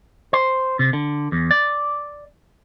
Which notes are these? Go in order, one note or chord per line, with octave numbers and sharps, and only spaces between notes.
C5
C3
D3
E2
D5